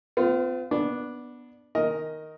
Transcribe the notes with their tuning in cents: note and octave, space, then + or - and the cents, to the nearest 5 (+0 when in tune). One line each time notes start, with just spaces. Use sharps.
C4 -45 F4 +0
B3 -10 D4 +0
D#3 +0 A#4 +0 D#5 +10